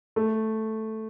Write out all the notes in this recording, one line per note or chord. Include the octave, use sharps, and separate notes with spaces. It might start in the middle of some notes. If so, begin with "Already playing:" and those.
A3